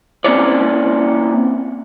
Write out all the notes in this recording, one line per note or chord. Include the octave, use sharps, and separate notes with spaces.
A#3 C4 C#4 E4 C#5 D5